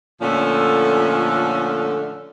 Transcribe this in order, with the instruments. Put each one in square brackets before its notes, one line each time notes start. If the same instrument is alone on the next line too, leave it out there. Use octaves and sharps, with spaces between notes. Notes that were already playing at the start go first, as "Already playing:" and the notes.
[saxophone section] A#2 D3 F3 A3 C#4